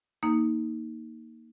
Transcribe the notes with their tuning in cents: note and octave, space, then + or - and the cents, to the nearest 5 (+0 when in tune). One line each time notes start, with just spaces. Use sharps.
A#3 +0 D#4 +10